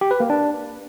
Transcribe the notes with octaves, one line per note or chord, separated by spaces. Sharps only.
G4
B4
A#3
D4